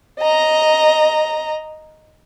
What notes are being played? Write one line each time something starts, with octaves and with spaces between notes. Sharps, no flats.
D#5 A#5